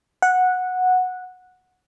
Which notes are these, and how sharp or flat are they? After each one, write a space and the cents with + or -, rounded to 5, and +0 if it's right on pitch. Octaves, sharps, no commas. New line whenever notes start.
F#5 -10